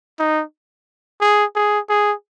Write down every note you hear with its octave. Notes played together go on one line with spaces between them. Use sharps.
D#4
G#4
G#4
G#4